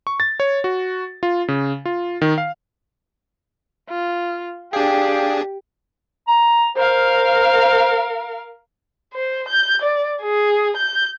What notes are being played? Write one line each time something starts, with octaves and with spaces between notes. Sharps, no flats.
C#6
A6
C#5
F#4
F4
C#3
F4
D#3
F5
F4
D4 G4 G#4 D5 F5 G5
A#5
A#4 C5 F5
C5
G6
D5
G#4
G6